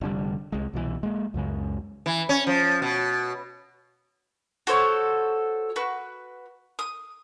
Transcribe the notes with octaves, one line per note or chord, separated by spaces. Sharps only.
F1 D3 G3
C2 G#3
C2 B2 E3
G#3 A#3
C#2 F#2 C#3 G#3
E3
C#4
F3
B2
F#4 A4 C5 C#5
F#4 B4
D#6